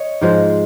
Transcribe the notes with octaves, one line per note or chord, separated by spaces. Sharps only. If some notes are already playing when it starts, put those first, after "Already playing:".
Already playing: C#5 D#5
G#2 F3 G#3 C5